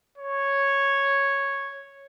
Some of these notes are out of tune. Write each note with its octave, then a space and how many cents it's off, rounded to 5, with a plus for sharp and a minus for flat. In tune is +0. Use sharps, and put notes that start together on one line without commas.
C#5 -5